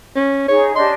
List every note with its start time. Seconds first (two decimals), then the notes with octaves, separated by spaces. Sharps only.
0.16 C#4
0.48 D#4 G#4 C#5
0.75 D4 G4 D#5 C6